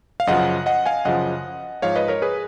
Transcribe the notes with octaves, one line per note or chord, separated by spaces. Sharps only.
F5
F#2 C#3 F3 D#5 F#5
D#5 F#5
F5 G#5
F#2 C#3 F3 D#5 F#5
G#2 F3 C#5 F5
B4 D#5
A#4 C#5
G#4 B4